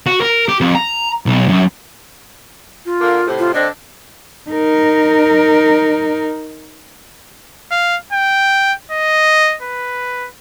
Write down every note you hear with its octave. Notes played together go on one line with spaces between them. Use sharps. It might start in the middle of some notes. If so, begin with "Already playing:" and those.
F#4
A#4
G4
F2
A#5
B1
F#2
F4
D3 A#3
A2 C3
F4
D3 C4 D4 D#5
D#4 A#4
F5
G5
D#5
B4